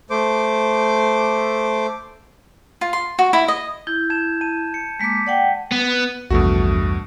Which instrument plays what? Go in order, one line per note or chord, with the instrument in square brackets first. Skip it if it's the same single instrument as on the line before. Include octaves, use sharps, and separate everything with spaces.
[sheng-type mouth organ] A3 C5 D6
[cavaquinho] F4
C6
F#4
E4
D#5
[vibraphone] E4 [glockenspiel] G6 G#6
[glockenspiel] A5 G#6 E7
A5 D#7
C#7
[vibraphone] G#3 A#3 D6 [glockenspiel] A#6 B6
[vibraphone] D5 F#5 G5
[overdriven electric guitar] B3
[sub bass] A#1 [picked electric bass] E2 G2 [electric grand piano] B2 A3 F#4